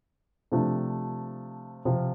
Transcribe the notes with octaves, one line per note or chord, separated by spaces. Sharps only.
C3 F3 A3 D4 G4
C3 F3 C4 F4